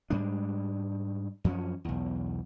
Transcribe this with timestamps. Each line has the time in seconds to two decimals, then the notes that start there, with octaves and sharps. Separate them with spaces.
0.10 G#2 G3 G#3 D4
1.44 F#2 F3 F#3 C#4
1.85 B1 E2